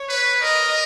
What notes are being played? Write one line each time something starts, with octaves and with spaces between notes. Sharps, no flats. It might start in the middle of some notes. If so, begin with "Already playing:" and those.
Already playing: C#5
B4
A#4 D#5